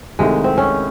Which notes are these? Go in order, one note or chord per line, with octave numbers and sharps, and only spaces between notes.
C2 C3 D#3 G#3 A3
C4
C#4